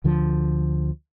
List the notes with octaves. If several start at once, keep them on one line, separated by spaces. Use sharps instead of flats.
D2 D3 F3